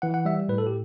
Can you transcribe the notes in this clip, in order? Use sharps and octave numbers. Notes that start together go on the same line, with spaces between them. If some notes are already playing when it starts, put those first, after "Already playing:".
E3 F#5
F#5
G3 E5
A2 B4
A4
G4